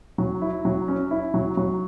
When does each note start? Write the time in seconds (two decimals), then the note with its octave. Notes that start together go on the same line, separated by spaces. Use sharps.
0.18 F#3
0.41 E4
0.65 F#3
0.88 C#4
1.11 E4
1.34 F#3
1.57 F#3